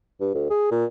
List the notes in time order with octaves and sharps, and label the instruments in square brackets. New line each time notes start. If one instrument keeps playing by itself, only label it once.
[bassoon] G2
D2
G#4
A#2